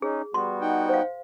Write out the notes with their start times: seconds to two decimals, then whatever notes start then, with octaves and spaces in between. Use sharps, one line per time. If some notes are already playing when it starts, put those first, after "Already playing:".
0.02 C#4 D#4 G#4
0.34 G3 B3 F#4 C6
0.61 D#4 F#5 G5
0.89 C5 F5